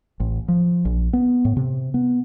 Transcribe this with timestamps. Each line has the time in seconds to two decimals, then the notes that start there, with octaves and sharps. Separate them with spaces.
0.20 A1
0.48 F3
0.85 A#1
1.13 B3
1.45 A2
1.57 C3
1.94 B3